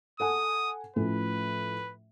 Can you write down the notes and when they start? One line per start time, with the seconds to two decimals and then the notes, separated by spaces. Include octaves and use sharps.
0.20 A4 F#5 G#5 D#6
0.96 A2 F3 C#4 B4